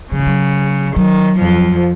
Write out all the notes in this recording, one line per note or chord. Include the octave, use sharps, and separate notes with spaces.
C#3 F#3
F3
F#3
D#3 F#3
F2 F3